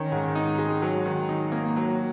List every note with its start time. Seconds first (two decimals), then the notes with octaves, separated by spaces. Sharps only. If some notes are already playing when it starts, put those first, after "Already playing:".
Already playing: D#3 C#4
0.12 G#2
0.35 D#4
0.58 G#3
0.82 F#3
1.06 D#3
1.29 D#4
1.52 A#3
1.76 F#3